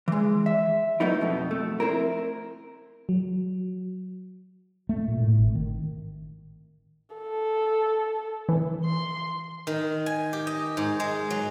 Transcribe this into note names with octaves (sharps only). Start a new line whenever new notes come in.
E3 G#3
E5
F#3 A3 B3 D#4 E4
F2 B2
A3
C4 E4 A#4
F#3
A3
A#2
A2
G#1
D#3
A4
E3
C6
D#3
G#5
G4
D#5
G#2
G#3
F#3